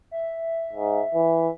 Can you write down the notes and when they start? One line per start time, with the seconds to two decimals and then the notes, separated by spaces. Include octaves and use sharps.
0.11 E5
0.73 G#2
1.15 E3